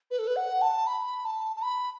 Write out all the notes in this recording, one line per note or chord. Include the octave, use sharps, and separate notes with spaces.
B4
A4
B4
F#5
A5
B5
A5
A5
B5